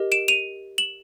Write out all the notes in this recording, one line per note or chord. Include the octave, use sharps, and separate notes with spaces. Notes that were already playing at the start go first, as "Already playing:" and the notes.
Already playing: G4 A#4 D#5
D7 E7
D#7 F7
E7 F#7